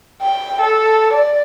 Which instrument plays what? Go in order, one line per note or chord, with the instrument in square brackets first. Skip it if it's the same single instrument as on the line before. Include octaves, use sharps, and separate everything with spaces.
[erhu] G5
A4
D5